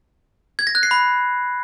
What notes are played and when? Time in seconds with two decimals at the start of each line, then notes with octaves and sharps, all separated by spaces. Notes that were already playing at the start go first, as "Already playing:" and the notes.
0.59 G#6
0.67 A#6
0.75 F#6
0.83 C7
0.91 B5